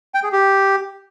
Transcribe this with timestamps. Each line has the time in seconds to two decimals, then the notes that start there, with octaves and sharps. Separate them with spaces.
0.14 G5
0.23 G#4
0.32 G4